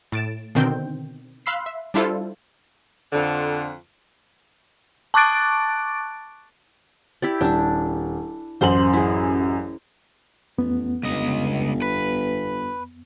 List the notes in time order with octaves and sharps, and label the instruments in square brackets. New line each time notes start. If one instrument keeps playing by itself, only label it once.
[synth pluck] A2 A6 D7 E7
B2 D3 D#3 C4 G5 G6
F5 B5 C6 E6 F#6 C7
E5
G3 D4 E4 F4 A4 C5
[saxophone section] F2 D3
[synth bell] A5 C#6 D6 F#6 A6 D7
[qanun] E4 G4 D5
[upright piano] D#1 [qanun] D4 E4
[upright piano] A1 F#2 F#7 [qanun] C5 C6
[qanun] E4 G#4
[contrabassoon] A1 [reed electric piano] F2 B3
[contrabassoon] G1 [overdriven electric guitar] C#2 D#5
[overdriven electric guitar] B4